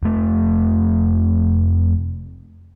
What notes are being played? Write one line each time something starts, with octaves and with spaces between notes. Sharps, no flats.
F1 A3